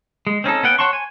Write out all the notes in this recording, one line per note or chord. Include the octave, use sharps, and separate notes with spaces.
G#3
C4 C#4 D#4 A4
B3 C#4 F#5 G5
C#5 F#5 A5 C6 C#6
G#5